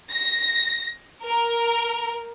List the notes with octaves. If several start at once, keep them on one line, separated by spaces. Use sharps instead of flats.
A#6
A#4